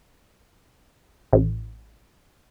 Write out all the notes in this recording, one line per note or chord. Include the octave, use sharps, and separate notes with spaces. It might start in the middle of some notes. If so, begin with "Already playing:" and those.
A1